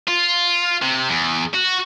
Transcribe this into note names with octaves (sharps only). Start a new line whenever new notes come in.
F4
C3
E2
F#4